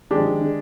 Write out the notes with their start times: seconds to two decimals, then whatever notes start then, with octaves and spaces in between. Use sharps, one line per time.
0.10 D#3 G#3 D4 G4
0.18 F3
0.26 D#3
0.41 D3